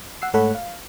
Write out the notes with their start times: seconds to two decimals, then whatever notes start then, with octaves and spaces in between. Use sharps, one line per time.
0.22 F#5 E6 C7
0.34 G#2 A3 A4 C#5 F#5 B5
0.55 F5